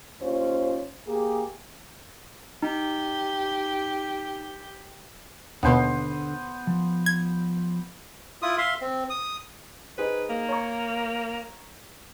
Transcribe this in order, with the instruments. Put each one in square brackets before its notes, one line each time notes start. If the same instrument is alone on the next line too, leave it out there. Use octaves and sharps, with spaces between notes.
[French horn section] D#2 C#4 F4 C5
A#3 G4 G#4
[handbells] D#4 [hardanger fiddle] G4
[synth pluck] D#2 B2 [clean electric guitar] D3 A5 [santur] B3 C5
[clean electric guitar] F3
[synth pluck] G#6
[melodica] E4 F4 D#6
E5 F5 C6
C4
D#6
[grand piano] D#4 G#4 C5 [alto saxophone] B4
[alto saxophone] A#3
[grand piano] C#5 A#5 C#6